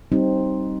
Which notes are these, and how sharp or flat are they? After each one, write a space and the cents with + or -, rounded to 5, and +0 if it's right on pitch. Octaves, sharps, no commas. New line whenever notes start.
G3 -25 C4 +10 D#4 +0